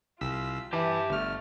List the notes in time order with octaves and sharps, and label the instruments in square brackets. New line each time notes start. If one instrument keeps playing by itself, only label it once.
[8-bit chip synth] C2 E6 B6 [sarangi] F4
[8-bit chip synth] E3 [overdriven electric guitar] G4 A5 [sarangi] E5
[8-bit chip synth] G1 F6 [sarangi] A3